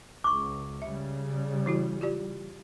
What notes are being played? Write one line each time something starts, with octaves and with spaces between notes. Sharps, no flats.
C#2 C#6 D6
C#3 G3 E5
E3 E4 F#4
F4 G4 D5